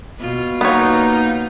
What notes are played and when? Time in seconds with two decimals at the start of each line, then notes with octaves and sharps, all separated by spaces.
0.19 B2 F4
0.61 A#3 B3 D#4 C#5